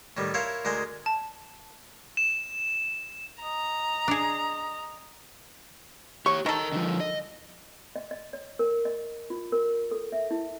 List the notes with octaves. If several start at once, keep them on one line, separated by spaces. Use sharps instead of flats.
A2 D#3 G3
E4 A#4 C5 C#5 F5
D2 G#3 A#4 C5 G#5
A5
E7
D#5 A#5
D4 G#4
G4 C#5 C#6
D#3 A4 A#4 D#5
D3 F3
D#5
D#5
D#5
C#5
A#4
D#5
F4
A#4
A4
E5
E4